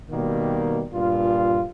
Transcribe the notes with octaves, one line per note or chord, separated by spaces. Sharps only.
B2 D#3 G3 A#3
G2 A#2 F4